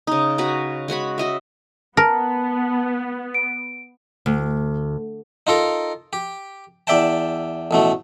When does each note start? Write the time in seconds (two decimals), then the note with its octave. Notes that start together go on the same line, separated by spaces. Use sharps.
0.07 C#3 D#4
0.38 F#4 B4 A#5
0.88 G#3 F#4 C#5 B5
1.18 F#4 D#5 E5
1.97 B3 A#4 A5
3.34 D7
4.26 D2
5.47 D#4 F4 A4 A#4
6.13 G4
6.87 E2 D5 E5 G5 A5
7.71 A1 B2 A3